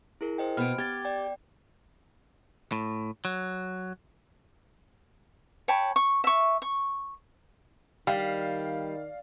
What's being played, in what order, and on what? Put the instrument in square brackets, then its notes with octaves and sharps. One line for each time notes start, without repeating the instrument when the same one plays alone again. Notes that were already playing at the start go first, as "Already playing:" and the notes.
[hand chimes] E4 G#4 A#4
C5 D#5 G5
[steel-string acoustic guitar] B2 B3 [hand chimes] F6 D7
[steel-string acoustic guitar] G4 [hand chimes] G#6 A6
[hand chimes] D5 G5
[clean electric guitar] A2
F#3
[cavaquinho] C#5 G5 A5 B5
C#6
E5 C#6
C#6
[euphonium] D#3 [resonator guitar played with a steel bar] G3 [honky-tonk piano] F5